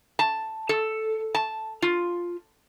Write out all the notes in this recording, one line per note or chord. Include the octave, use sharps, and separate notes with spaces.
A5
A4
A5
F4